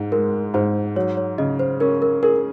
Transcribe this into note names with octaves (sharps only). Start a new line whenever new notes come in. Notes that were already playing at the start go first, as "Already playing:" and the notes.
Already playing: G#2
G#3 A#4
G#2 C5
F#3 C#5
C#5
C#3 D#5
C5
C#4 A#4
A#4
G#4 A#4